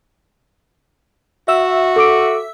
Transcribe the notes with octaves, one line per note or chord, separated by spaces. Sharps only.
F#4 E5 E6
A4 D6 D7